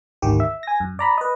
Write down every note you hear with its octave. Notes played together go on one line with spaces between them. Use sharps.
G#1 D2 D#3 G4
E5
G#5 A#6
F#2
D5 A#5 B5
B4 D#5